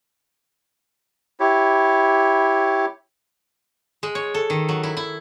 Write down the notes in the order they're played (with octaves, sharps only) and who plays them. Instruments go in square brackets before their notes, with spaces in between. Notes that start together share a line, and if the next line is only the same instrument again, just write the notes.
[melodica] E4 G4 C#5
[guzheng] G#3
C#5
A4
D#3
F#3
E4
E4